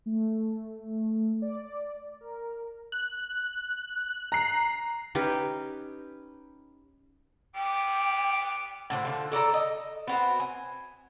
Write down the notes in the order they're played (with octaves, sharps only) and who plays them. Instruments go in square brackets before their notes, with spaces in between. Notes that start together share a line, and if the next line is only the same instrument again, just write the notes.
[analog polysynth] A3
D5
A#4
[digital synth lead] F#6
[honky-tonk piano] A#5 C7
[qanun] C#4 D#4 G4 B4
[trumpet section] G3 B3 D6 [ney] G5
[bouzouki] A2 D3 G4 C5
D3 F3
A4 D5 A5 A#5
D#5
B3 C4 F#4
G#5